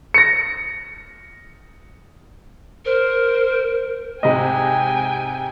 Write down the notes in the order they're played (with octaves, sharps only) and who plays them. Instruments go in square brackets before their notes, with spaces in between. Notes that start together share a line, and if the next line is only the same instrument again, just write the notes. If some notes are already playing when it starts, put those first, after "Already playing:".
[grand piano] A#6 C#7
[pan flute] A#4 [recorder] C5
[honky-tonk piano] G#2 C3 G#3 [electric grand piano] D#5 [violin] G5 G#5